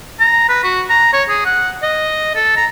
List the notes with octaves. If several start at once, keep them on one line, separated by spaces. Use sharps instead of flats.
A#5
B4
F#4
A#5
C#5
G#4
F#5
D#5
A4
A#5